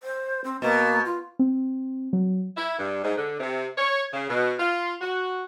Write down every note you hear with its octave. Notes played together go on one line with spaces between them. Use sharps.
C5
C4
B2 A#3
F4
C4
F#3
E4
G2
G#2
D3
C3
C#5
C#3
B2
F4
F#4